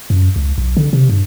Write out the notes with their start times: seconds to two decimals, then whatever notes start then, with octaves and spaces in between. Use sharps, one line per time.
0.10 F#2
0.36 C#2
0.58 B1
0.77 D3
0.93 C3
1.09 G2